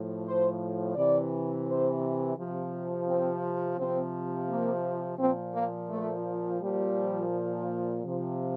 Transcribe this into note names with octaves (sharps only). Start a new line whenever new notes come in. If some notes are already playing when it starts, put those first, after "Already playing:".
Already playing: A2 F3
C5
C3 E3 D5
C5
C3 F3
C4
C3 F3 C4
A#3
A#2 F3 C4
A#3
A3
A#2 F3 G3
C3 F3